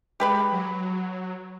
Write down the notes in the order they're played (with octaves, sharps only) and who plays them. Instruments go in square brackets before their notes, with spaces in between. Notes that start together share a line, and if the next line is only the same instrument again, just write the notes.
[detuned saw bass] G#3 [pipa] G4 B4 B5
[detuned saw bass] F#3